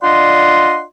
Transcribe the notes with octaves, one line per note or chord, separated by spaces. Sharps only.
D4 F4 D5 D#5 F#5 C6